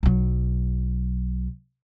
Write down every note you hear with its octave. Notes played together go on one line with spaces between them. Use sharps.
B1 F#3